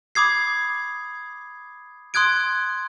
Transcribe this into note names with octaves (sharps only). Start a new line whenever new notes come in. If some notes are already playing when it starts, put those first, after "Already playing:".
B5 D6 D#6 G#6 C7
C6 D#6 F#6 G#6 D7